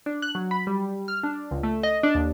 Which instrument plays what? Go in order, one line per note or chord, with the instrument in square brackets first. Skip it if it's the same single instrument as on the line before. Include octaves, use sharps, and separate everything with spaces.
[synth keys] D4
F#6
F#3
B5
G3
F6
D4
C#2
A3
D#5
D4
D#2